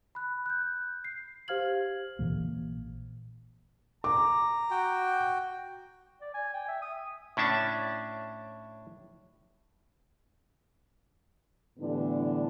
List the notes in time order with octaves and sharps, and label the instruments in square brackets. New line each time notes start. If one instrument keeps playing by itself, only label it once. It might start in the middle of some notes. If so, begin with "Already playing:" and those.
[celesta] B5 F#6
F#6 G6
C7
G4 C5 F5 F6 G#6 F#7
[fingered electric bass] A#1 A#2 E3 A#3
[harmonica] A#5 [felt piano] D6
[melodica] F#4 G5
[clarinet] D5
G#5
G5
E5
D#6
[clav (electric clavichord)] A2 C#4 D4 E5 A5
[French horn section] A2 D3 E3 G3 B3 D4